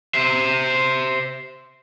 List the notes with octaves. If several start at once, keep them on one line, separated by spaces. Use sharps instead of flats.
C5 E5